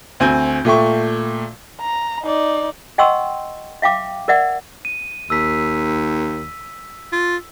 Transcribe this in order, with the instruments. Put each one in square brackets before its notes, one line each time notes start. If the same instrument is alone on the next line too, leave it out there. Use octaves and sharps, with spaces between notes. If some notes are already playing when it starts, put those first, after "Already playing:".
[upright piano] D2 C4 G#5 G6
A#2 A3 G5 C#6
[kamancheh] A#5
D#4 D5
[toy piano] D#5 F#5 G5 C6 C#6 E6
E5 F5 G5 D6
A#4 D5 E5 F#5
[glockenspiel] D#7
[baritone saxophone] D#2 [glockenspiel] E6 B6
[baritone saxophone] F4